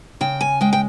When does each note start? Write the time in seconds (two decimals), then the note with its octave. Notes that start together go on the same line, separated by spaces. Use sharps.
0.21 C#3 G5
0.41 G#5
0.61 G#3 G5
0.73 G5